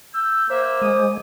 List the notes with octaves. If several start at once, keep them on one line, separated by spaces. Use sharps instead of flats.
E6 G6
A#3 C5 E5
G#3 D#6